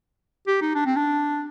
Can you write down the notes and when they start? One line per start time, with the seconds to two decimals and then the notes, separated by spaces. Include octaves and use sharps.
0.47 G4
0.61 D#4
0.75 D4
0.86 C4
0.96 D4